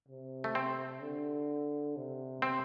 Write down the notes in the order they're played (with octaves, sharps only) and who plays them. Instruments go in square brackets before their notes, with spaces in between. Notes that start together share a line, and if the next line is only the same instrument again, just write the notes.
[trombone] C3
[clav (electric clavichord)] A3
C4
[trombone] D3
C3
[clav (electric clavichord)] C4